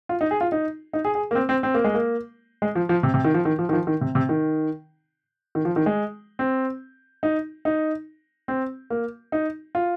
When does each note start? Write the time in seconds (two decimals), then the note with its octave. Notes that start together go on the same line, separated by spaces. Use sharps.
0.09 F4
0.21 D#4
0.31 G#4
0.41 F4
0.52 D#4
0.93 D#4
1.05 G#4
1.15 G#4
1.31 A#3
1.35 C4
1.49 C4
1.63 C4
1.74 A#3
1.84 G#3
1.95 A#3
2.62 G#3
2.75 F3
2.89 F3
3.03 C3
3.14 C3
3.25 D#3
3.34 F3
3.45 D#3
3.59 F3
3.69 D#3
3.73 F3
3.87 D#3
4.01 C3
4.15 C3
4.29 D#3
5.55 D#3
5.65 F3
5.76 D#3
5.86 G#3
6.39 C4
7.23 D#4
7.65 D#4
8.48 C4
8.90 A#3
9.32 D#4
9.75 F4